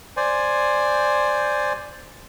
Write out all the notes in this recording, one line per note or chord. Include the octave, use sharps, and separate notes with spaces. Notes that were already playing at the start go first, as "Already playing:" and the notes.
C5 D5 G#5